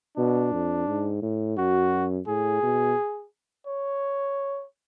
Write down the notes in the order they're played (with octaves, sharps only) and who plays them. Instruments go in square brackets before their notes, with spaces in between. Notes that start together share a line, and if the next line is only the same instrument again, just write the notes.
[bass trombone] B2 [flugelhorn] D4
[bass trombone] F2
G#2
A2
[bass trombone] F#2 [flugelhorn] F#4
[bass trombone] A2 [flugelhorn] G#4
[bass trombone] B2
[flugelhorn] C#5